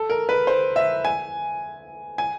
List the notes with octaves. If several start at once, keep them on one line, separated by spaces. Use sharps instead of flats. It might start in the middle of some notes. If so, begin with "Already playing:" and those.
Already playing: A4
A#4
B4
C5
E5
G#5
G#5